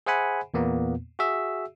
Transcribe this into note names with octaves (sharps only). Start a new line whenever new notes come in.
G#4 C5 E5 F#5 G#5 B5
E2 A#2 A#3 B3
F#4 G#4 E5 E6